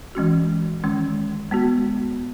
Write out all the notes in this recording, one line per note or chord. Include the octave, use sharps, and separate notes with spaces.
E3 G#3 C#4 F#4
D#3 G#3 C#4
G#3 B3 F#4